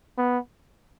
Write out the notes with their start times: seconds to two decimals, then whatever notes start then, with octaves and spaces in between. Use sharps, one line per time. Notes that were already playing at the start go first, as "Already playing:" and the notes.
0.18 B3